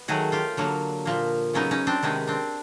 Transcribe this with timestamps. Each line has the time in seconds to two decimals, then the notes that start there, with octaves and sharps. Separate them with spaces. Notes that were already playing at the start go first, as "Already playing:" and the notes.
Already playing: B3
0.08 D#3 F#3 A3 F#4 G#4
0.32 F4 G4
0.57 D3 F#3 A#3
1.05 A#2 F3 A#3
1.53 C#3 F#3 B3 C#4 D#4
1.71 C#4 D#4
1.87 C4 D4
2.02 C3 D#3 G#3 B3 C#4 D#4
2.27 C4 D4